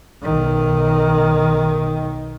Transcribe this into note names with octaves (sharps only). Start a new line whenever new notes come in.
B1 D#3